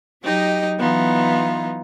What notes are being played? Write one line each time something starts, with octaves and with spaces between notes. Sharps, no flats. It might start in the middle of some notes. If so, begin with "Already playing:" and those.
F#3 D#4 G4 D#5
E3 F#3 B3 D#4 F4